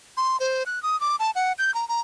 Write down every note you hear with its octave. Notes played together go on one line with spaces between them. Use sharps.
C6
C5
F#6
D#6
D6
A5
F#5
G6
A#5
A#5